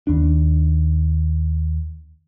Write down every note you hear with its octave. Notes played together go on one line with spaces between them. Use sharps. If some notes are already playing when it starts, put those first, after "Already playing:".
D#2 D4